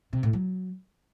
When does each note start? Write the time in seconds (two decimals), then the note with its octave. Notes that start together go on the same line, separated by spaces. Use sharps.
0.13 C3
0.23 A2
0.33 F#3